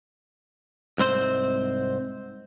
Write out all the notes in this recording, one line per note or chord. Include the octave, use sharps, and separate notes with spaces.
C2 G#2 C4 C5